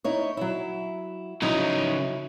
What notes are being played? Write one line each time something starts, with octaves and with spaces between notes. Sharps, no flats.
D#4 E4 C#5
F#3 E4
C#3 F#3 C#4 D#4 E4